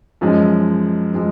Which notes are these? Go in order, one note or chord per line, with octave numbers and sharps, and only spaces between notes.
F#2 F3 G#3 D#4
F3 G#3 D#4